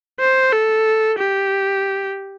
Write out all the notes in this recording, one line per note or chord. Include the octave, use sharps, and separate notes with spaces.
C5
A4
G4